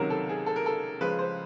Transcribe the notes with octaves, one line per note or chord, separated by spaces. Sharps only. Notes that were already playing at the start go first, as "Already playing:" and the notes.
Already playing: C#2 C3 D#3 F#3 A#4
A4
G#4
A4
A#4
A4
C#2 C#3 F3 G#3 B4
C5